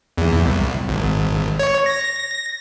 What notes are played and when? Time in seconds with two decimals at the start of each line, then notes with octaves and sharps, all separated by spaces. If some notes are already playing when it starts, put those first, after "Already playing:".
0.18 E2
0.45 C2
0.89 G#1
1.59 C#5
1.86 A#6